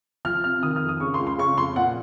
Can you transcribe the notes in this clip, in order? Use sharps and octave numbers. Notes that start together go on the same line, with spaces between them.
F3 F6
C3 F6
D#3 D#6
F6
F2
D#6
C#3 C#6
C6
C#2
C6
C#3 C#6
F2 C6
A#2 F#5